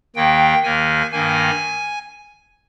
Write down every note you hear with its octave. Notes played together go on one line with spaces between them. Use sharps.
D#2 D#3 A#3 G5
D#2 D#3 A#3 G#5
G2 D#3 A#3 G#5